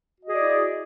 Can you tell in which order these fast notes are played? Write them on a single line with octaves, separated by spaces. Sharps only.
F#4 D#5 G#4 D5 E4